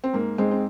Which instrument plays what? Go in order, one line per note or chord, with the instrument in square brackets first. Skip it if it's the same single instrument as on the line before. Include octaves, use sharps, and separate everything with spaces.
[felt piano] C4
G#2 A#3
G#2 G#3 C4
C4